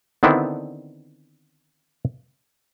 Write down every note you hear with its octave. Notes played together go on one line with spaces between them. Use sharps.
D3 D#3 B3 C4 D4 E4